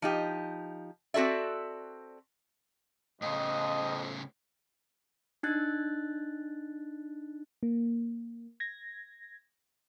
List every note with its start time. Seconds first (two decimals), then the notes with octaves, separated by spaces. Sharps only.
0.02 F3 D#4 G4
1.14 C4 F#4 A4 D5 E5
3.22 F2 A2 C#3 D#5
5.43 D4 D#4 F#6 A6
7.63 A#3
8.60 G#6 A#6